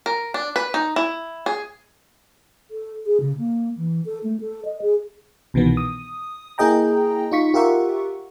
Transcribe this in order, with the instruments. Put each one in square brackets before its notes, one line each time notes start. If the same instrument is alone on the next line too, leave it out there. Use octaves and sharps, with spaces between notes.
[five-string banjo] A#4
D4
B4
D#4
E4
G#4
[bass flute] A4
G#4
C#3
A#3
E3
A4
A3
A4
D#5
G#4
[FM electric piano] C2 B2 D#3 E3 B3
D#6
A#3 E4 G#4 D#5 G5 A#5
D#4 F4 C#6 B6
F4 G4 A#4 E5 F#5 C#6